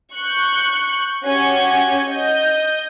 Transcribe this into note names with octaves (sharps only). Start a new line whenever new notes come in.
C#6 F#6 G6
C#4 F#4 G4 G#6
D#5 G6